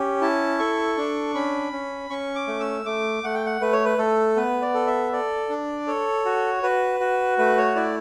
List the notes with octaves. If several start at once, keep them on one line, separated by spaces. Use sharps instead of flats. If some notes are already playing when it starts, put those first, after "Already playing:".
Already playing: C#4 G4
E4 A5
A4 C#6
D4
C#4 B5
C#4
C#4 C#6
D6
A3
E6
A3 D6
A3 F#5
G5
F#5
A3 B4
C#5
B4
A3 A4
B3 B4
D5
A4
E5
A4 D5
D4
A4 C#5
F#4
F#4 B4
F#4
A3 B4
C#5
E4 D5